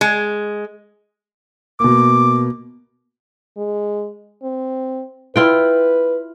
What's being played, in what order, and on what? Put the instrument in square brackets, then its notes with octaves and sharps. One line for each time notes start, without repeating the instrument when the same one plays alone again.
[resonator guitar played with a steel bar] G#3
[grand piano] B2 A#3 [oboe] D6
[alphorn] G#3
C4
[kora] E4 F4 G5 [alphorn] B4